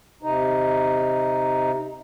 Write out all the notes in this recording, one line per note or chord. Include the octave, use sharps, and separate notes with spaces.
C3 D#4